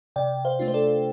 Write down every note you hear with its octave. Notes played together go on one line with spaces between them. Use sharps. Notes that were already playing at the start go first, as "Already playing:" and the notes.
C3 D5 G5
C5 F5
A3 D4 F4
C5
A4 D5